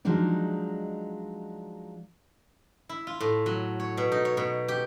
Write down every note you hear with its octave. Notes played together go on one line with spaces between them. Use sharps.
F3 F#3 G#3 D4 D#4
E4
F4
A2
F#3
C#5
B2
D#4
C#5
B2
G4